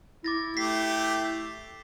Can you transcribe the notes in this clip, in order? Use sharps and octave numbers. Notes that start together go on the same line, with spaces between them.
E4 D6 A6 A#6
A3 G4 B6 C7